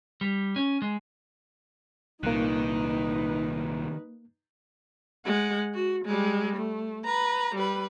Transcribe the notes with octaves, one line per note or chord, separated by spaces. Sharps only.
G3
C#4
G#3
C2 A#2 D#3 A#3 D#4 B4 F#6
G#3 F#5
F#4
G3 G#3
A3
B4 A#5
G3 B4